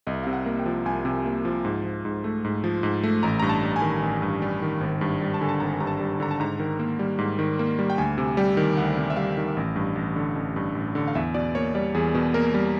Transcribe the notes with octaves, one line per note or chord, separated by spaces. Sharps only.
C2 D#5
C3 F5
F#5
A#3
G5
F3
C2 G#5
C3
A#3
F3
G#2
F3
G#2
A3
G#2
F3
G#2
A3
A1 A#5
A#5
G2
A5
G3
G#5
D#3
A1
G2
G3
D#3
G#1
G2
G3
A5
D3 G#5
A5
G#1 A#5
G2 A#5
A5
G3
D3 A#5
A5
G#2 A#5
D#3
A#3
G3
G#2
D#3
A#3
G3
G5
D2 G#5
C3
G3 G5
D#3
D2 F#5
C3
E5
G3 F5
D#3
A1
G2
A1
D3
A1
G2
A1
D3
F5
E2 E5
B2 D5
A#3 C#5
G3 D5
E2 G#4
B2
A#3 A#4
G3